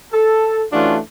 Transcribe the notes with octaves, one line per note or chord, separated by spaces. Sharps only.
A4
E3 A3 C#4 D4 F4 F#4